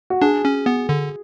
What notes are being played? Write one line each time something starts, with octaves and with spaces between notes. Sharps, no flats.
F#4
D4 G#4
C#4
B3
D3